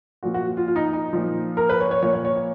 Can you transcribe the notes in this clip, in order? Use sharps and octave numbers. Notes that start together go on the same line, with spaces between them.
A#2 F3 F#4
F#4
F4
F4
D#4
D#4
A#2 F3
A#4
B4
C#5
C#5
A#2 F3 C#5
C#5
C#5
C#5